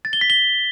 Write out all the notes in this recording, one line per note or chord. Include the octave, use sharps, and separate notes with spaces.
A6
G7
B6
G7